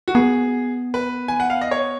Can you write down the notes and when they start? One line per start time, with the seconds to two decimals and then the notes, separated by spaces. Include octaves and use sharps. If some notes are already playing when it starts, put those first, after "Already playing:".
0.08 F#4
0.15 B3 G#4
0.94 B4
1.28 G#5
1.40 F#5
1.50 F5
1.61 D#5
1.71 C#5